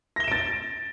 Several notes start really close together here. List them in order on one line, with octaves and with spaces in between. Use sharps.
A#6 G7 E7 D7 A6